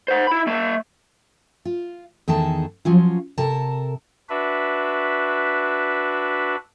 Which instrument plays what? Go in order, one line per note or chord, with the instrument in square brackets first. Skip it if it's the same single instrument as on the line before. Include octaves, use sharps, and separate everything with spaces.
[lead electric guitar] C5 F#5
E4 B5
A#3 E5
[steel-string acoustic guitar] F4
E2 D#3 G#4 A4 A5
F3 F#3 C#4 F4
C3 A4 A#4 A5
[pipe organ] D4 F#4 B4 E5